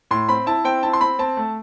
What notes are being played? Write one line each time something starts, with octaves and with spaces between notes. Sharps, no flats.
A2 C6
C4 B5
E4 A5
C4 G5
E4 A5
C6
C4 B5
C4 A5
A3